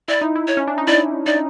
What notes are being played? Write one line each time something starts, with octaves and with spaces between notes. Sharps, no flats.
E4 D5
D#4
E4
C#5
C#4
D4
D#4
E4 D5
D#4 D5